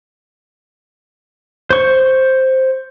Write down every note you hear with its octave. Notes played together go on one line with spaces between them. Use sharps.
C5 C#6